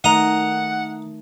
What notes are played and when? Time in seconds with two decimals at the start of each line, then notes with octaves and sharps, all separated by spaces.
0.04 D#3 A3 D#5 F#5 A#5